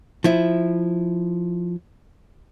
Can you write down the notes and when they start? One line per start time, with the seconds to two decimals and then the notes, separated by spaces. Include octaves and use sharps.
0.24 F3 E4